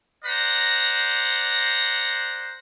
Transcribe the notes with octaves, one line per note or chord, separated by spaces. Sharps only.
C5 D5 F#5 A#5